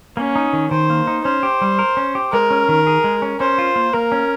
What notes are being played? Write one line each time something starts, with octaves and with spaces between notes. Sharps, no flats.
A#3 C#4
D#4
D#3
D#3 C5
A#3
D#4
C#4 C5
G4
G3
A#4
C#4
G4
G#3 A#4
C#4
D#3
G#4
G#3
C#4
C#4 C5
F4
A#3
A#3 A#4
C#4